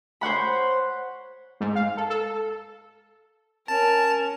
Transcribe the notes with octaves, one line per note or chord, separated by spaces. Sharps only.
C5 C#5 F#5 B5
G#2
F5
A4
A4
C#4 A#4 A5